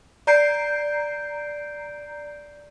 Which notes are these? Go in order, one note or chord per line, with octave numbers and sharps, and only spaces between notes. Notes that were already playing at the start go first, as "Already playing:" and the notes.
D5 A#5 G6 C7 D7